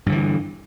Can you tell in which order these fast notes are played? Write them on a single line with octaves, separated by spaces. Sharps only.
G2 D3 E3